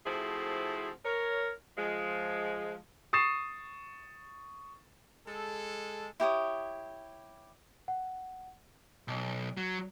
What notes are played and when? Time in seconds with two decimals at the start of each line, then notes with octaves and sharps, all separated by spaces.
0.06 F3 A3 C4 E4 F#4 G#4
1.05 A#4 C#5
1.77 F3 G#3
3.13 C#6 D#6 A6 C7 E7
5.27 G#3 A4
6.20 E4 G4 C#5 D#6
7.88 F#5
9.08 B1
9.57 F#3